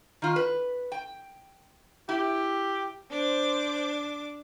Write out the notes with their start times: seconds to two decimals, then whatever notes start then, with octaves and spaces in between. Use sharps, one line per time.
0.22 D#3 F4
0.36 B4
0.92 G5
2.09 E4 G4
3.10 D4 C5 D6